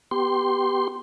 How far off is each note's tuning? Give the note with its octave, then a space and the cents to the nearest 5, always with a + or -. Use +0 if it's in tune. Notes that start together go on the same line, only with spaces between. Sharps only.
B3 +0 G4 +0 C6 +0